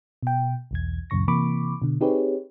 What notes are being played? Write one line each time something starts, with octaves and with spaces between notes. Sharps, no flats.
B2 G5
B1 E2 G#6
C#2 F#2 A#2 C#3 C#6 A#6
C3 E3 A#3 B5 C#6 D6
B2 D3
C4 D#4 G4 G#4 B4 C#5